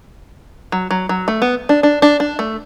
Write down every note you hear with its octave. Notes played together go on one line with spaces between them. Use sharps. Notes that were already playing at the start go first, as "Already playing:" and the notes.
F#3
F#3
F#3
A3
B3
D4
D4
D4
D4
A3